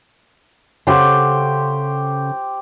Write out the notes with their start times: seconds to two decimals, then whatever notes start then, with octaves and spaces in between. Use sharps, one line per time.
0.87 C#3 G4 A4 C5 F#5 C6